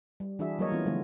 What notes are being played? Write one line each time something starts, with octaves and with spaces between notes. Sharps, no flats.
G3
E3 D4 E4 F#4 G#4 E5
F#3 G3 A#3 A#4 C#5 D#5
E3 B3 C#4 F4
D3 F3 F#3 G#3 A3 B3